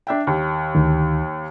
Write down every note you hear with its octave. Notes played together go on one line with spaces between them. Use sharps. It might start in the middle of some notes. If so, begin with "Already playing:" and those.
D4 E5 G5
D#2
D2 D#3